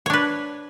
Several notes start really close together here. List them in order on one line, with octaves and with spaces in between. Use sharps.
C#5 D4 B4